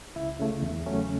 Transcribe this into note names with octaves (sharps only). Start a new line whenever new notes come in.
C#2 E4 E5
C#3 A3
E2
C#3 F#3 A3 C#4